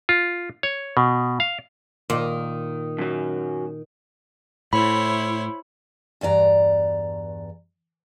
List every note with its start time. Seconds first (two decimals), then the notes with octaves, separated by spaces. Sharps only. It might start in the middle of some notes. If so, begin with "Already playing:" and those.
0.09 F4
0.63 C#5
0.97 B2
1.40 F5
2.10 A#2 D#3
2.98 F#2 F#3
4.73 A2 E4 C5 C#5 B5
6.21 E2 G2 D5 A#5